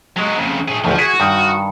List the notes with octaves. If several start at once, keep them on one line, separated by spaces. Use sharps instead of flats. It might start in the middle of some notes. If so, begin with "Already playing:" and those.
F#3 G#3
F2 C#3
A2 G#4
G#1 D2 A2 F3
E4 F#4 G#4
G2 D#3